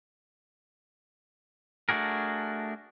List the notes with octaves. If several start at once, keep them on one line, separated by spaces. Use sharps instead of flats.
A3 D4 F#4 G#4 A#4